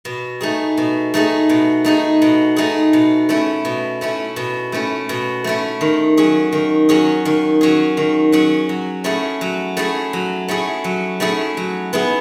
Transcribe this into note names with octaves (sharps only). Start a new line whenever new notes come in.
B2
A3 D#4 G#4
B2
A3 D#4 G#4
B2
A3 D#4 G#4
B2
A3 D#4 G#4
B2
A3 C#4 E4
B2
A3 C#4 E4
B2
A3 C#4 E4
B2
A3 C#4 E4
D#3
F#3 C#4 G#4
D#3
F#3 C#4 G#4
D#3
F#3 C#4 G#4
D#3
F#3 C#4 G#4
F#3
A3 C#4 E4 G#4
F#3
A3 C#4 E4 G#4
F#3
A3 C#4 E4 G#4
F#3
A3 C#4 E4 G#4
F#3
B3 E4 G#4